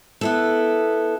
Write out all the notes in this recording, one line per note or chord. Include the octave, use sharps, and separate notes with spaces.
B3 E4 A4